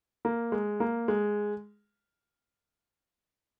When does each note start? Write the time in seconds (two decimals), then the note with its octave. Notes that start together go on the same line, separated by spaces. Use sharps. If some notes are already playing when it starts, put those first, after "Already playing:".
0.25 A#3
0.52 G#3
0.80 A#3
1.08 G#3